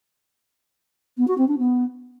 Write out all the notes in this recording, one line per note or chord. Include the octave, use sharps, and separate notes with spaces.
B3
F#4
C4
D4
B3